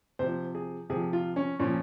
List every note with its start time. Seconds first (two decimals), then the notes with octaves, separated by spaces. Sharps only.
0.19 C3 F3 C5
0.55 G#4
0.90 C3 F3 G#4
1.13 F4
1.36 C#4
1.60 A#2 F3 C#4